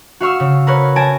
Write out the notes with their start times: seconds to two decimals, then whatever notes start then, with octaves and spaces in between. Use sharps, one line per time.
0.20 F#4 F5 C#6 E6
0.40 C#3
0.67 A#4 B4 C#5
0.96 G#5 A5 A#6 D7